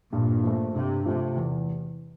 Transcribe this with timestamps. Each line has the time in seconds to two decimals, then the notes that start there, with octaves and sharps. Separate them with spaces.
0.12 G2 A#2
0.43 F3 A3
0.74 G2 C3
1.06 C3 F3 A3
1.37 E2